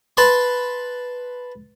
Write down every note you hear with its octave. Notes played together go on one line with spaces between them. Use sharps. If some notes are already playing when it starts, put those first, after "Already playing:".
B4 A5 B5 C6